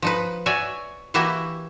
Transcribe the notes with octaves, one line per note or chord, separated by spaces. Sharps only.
F3 D#4 B4
F#4 C#5 D5 E5 G#5
E3 A#3 E4 F#4 G4 E5